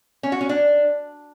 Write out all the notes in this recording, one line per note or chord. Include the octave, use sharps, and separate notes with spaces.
C#4
F#4
C#4
D4